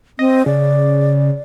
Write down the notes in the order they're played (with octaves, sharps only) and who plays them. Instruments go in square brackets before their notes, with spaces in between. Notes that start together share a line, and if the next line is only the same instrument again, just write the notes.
[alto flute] C4 [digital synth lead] D#5
[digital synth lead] C#3 [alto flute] D5